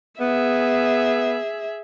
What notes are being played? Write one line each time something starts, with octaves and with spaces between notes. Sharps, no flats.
B3 G#4 E5